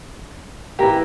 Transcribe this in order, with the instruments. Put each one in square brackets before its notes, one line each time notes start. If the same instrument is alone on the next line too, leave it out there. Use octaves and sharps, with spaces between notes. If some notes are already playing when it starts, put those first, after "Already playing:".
[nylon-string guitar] E3 A#3 [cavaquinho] G4 A#4